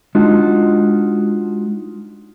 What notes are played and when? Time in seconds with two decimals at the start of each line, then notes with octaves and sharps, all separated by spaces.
0.15 G#3 D4 D#4 F4 F#4